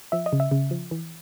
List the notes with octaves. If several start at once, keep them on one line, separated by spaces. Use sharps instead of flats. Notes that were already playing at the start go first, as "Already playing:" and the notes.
F3 E5
D#5
C#3
E5
C#3
F3
E3